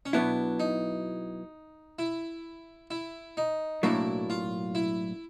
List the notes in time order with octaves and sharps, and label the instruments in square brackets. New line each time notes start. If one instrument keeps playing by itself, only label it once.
[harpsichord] C#4
[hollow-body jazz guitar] B2 F#3 B3 E4 [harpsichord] D4
[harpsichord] D#4
E4
E4
D#4
[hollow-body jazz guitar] B1 A2 F#3 A#3 D4 [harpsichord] E4
[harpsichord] F4
E4